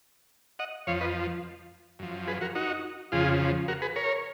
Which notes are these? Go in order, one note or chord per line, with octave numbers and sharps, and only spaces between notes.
D#5 F#5
F2 F3 C#5 F5
B4 D#5
F#2 F3
G#4 B4
F#4 A#4
D#4 F#4
F2 C#3 F3 F4 G#4
F#4 A#4
G#4 B4
A#4 C#5